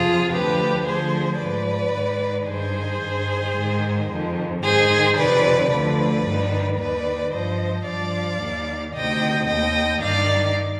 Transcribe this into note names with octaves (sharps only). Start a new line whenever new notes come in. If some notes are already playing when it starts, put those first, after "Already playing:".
Already playing: F2 C3 F3 F4 G#4
D2 D3 F3 G4 B4
D2 D3 F3 G#4 C5
G#2 F3 B4 D5
G#2 D#3
G2 D#3 G#4 C5
G2 D#3
G#2 D#3
F2 D#3
G#2 D#3 G#4 C5
F2 C3 D#3 B4 D5
D2 D3 F3 B4 D5
G2 D#3
D#2 D#3 B4 D5
G2 F3 C5 D#5
G2 F3 D5 F5
D#2 D#3
D2 C3 D#3 D#5 G5
D#2 D#3 D#5 G5
G2 D#3 D5 F5